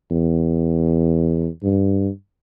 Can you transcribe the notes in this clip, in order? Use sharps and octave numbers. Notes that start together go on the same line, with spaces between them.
E2
G2